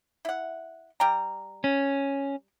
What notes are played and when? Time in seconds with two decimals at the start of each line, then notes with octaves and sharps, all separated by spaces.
0.25 E4 F#5
1.00 G3 G5 A#5
1.64 C#4